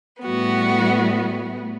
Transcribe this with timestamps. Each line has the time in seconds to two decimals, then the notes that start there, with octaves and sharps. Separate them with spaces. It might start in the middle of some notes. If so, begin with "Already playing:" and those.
0.22 A2 G3 B3 F#4